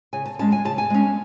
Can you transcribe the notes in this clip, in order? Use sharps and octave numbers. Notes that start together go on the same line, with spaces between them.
C#3 G#5
A5
G#3 C#4 A5
G#5
C#3 A5
G#5
G#3 C#4